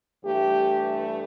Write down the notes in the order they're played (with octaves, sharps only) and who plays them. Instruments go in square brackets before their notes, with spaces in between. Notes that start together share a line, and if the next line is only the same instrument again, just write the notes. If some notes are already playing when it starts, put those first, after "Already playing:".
[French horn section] G2 E3 A3 G4